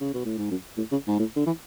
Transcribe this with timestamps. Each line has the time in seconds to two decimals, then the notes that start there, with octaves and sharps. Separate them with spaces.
0.01 C#3
0.14 B2
0.25 A2
0.38 G#2
0.51 F#2
0.77 A2
0.92 C#3
1.07 G#2
1.19 A2
1.36 D3
1.46 E3